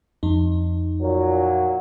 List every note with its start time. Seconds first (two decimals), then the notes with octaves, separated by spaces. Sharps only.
0.23 F2 D#4
1.01 A#2 F#3